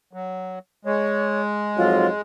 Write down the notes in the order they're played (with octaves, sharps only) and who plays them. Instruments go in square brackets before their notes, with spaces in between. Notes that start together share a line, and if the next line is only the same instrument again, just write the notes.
[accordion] F#3
[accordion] G#3 [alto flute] C#5
[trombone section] F2 G#2 F#3 [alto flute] F4